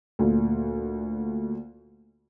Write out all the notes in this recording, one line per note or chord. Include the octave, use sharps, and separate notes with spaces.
D2 A#2